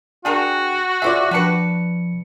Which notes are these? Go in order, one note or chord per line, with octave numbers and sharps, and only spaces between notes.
D4 F#4 G#4 A#4 G5
F4 G#4 C5 D5 E5
F3 G3 D4 B4 C#7